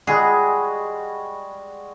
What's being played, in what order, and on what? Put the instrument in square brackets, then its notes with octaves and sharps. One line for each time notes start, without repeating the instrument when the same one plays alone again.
[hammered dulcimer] G3 G#3 F#4 [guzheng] G#4